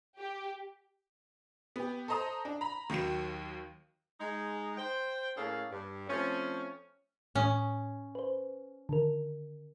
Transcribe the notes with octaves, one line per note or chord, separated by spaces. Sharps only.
G4
B3 G4
A4 C5 D#5 A#5 D#6
D4
A#5 B5
D#2 D#3 F#3 C#7 E7
G#3 D#4
C5 G5
A2 A#3 C#4 G#4 A4 F5
G2
F3 A3 C4 C#4
A2 C#4 D#6
B4 C5
D3 D#3 A#4